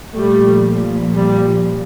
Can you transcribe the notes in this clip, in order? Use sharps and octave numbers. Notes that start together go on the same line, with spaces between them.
A#2 F3 G3 A3
G3